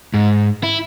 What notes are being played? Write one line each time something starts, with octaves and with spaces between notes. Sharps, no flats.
G#2
E4